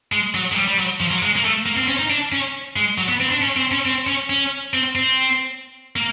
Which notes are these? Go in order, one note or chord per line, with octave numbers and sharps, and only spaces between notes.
G#3
F#3
G#3
G3
G3
F#3
F3
F#3
G#3
A#3
A3
A#3
C4
C#4
D#4
D4
C#4
G#3
F#3
B3
C4
D4
C#4
C4
C#4
C4
C#4
C#4
C4
C4
A#3